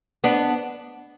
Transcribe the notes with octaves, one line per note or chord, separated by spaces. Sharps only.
B3 D4